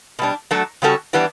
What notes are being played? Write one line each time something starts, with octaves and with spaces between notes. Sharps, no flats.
B2 G3 D4
F#3 A3 D4 F#4 A4
C#3 G3 C#4 F#4 A4
E3 G3 B3 D4